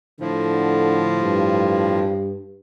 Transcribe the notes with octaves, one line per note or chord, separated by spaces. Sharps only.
A2 D3 F3
G2